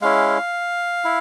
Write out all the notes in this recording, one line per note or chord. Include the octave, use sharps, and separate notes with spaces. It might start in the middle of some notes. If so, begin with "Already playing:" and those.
G#3 C#4 E4 F5
E4